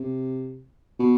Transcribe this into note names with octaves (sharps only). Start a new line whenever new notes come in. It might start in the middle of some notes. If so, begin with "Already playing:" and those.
Already playing: C3
B2